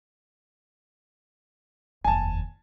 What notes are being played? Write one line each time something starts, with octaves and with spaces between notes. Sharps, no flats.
F1 D#2 G#5 A5